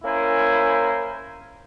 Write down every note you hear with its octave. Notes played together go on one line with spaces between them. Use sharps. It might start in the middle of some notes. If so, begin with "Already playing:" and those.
A#3 C#4 E4 A#4 C5 G#5